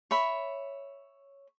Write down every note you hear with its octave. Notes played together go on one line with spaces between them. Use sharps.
C#5 E5 B5